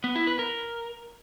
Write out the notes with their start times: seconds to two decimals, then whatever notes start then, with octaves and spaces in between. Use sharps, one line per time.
0.04 B3
0.16 E4
0.27 B4
0.39 A#4